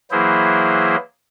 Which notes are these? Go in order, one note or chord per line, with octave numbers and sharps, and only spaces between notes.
E3 F#3 A#3 E4 G#4 C5